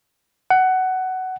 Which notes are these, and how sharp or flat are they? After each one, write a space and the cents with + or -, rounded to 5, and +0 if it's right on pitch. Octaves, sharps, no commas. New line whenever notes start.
F#5 +15